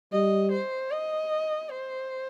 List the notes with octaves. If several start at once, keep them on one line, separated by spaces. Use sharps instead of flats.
G3 D#5
C5
D#5
C5